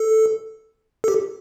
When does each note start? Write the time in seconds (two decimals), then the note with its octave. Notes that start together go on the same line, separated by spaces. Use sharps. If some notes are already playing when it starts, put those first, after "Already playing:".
Already playing: A4
1.04 A4
1.08 G4